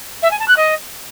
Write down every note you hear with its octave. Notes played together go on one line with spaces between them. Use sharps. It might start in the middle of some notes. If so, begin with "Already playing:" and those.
E5
G#5
A5
F#6
D#5